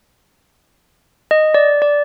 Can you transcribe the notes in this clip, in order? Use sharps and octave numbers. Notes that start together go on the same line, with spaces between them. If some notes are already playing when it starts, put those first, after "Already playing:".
D#5
D5
D5